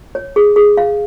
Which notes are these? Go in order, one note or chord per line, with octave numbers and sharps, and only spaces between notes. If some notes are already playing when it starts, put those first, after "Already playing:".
C#5
G#4
G#4
F5